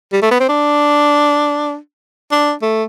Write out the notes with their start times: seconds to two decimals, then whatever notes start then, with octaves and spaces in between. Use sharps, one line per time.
0.12 G3
0.22 A3
0.31 B3
0.40 C4
0.49 D4
2.31 D4
2.62 A3